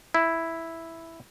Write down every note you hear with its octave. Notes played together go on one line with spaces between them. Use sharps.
E4